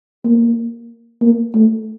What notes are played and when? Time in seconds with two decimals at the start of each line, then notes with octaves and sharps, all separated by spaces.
0.25 A#3
1.21 A#3
1.54 A3